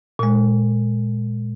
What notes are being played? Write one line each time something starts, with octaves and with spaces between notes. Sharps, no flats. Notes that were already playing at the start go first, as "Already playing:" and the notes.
A#2 G#3